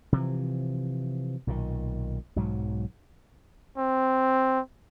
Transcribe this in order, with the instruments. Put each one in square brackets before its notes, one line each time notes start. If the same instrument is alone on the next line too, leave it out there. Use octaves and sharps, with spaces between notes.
[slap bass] C3 E3 F3
B1 A#2 D3 D#3
B1 G#2 F#3
[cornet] C4